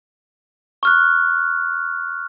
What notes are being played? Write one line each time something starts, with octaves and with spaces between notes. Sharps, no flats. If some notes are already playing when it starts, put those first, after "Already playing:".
C#6 F6 F#6